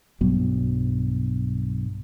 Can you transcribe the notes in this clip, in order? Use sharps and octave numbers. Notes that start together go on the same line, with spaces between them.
B1 G2 B2 F#3